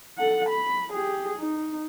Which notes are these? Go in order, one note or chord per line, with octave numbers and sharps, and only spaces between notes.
A4 F#5
B5
G4 G#4
D#4